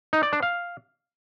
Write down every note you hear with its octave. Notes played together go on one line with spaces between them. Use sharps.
D#4
D5
D4
F5